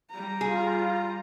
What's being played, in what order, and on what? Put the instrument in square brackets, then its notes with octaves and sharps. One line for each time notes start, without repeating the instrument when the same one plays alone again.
[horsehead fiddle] G3 A#5
[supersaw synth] F4 [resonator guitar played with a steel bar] G#4